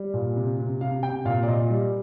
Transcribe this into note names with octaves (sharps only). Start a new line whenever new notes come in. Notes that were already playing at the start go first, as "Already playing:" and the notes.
Already playing: G3
A#2
C3
C3
C3 F5
C3 G5
A#2 F5
D5
A#2 D#5
G3